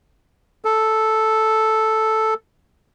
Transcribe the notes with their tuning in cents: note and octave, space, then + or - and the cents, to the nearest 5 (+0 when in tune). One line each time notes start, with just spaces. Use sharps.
A4 -5